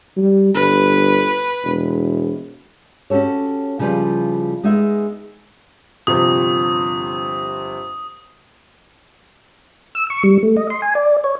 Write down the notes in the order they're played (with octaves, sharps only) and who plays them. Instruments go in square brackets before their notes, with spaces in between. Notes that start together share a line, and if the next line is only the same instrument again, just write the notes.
[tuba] G3
[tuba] G1 [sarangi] B4
[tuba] E1
[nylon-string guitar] C#4 F#4 G4 A4 C#5
C#3 F3 G3 E4 B4 C5
G#3 B3 D#4 G#4 E5
[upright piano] G1 C3 F3 [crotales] D#6
[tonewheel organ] E6
C#6
G3
A3
D#5
C6
G#5
D5
C#5